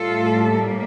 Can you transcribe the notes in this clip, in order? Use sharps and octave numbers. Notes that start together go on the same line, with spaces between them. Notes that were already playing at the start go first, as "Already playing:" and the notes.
Already playing: A2 G3 F4 A4
A#3